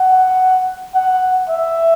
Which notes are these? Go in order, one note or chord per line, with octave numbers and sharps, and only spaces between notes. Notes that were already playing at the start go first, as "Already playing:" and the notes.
Already playing: F#5
F#5
E5